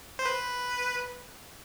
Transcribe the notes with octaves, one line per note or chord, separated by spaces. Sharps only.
C5
B4